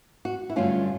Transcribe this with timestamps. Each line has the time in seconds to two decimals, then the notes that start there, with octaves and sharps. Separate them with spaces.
0.25 F#4
0.50 E4
0.56 G2 D3 F#3 A3 C#4 F4